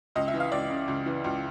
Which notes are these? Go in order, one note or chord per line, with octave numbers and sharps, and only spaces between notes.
C#2 D#5
E5
E3
F5
C#2 D5
C#3
C#2
E3
C#2